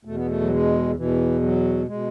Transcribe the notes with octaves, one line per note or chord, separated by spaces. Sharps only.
E2 B2 A3
B3
A3
F#3
G#3
E2 B2 E3
F#3
B2 G#3